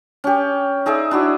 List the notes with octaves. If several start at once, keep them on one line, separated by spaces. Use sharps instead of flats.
C#4 G4
D#4 G#4 D5 E5
D4 E4 F#4